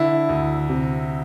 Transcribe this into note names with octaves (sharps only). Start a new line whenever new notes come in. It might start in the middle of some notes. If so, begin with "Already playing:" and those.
Already playing: D3 E4
D2
C3